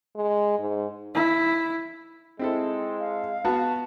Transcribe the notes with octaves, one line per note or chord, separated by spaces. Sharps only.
G#3
G#2
E4
G#3 C4 E4 A4
F5
B3 F#4 A5